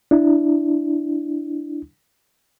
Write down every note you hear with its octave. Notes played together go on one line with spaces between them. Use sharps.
D4 E4